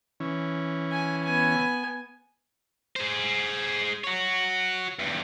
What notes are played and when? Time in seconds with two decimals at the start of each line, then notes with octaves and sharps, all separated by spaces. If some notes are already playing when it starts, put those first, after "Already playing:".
0.20 E3 C#4
0.92 G#5
1.24 B3 G#5
2.96 G#4 C5
4.04 F#4 C#5
4.99 E2 G2